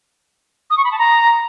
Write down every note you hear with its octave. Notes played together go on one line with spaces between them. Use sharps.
D#6
C#6
B5
A5
A#5